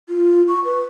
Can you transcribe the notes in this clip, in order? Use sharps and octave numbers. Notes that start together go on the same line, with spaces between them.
F4
C#6
B4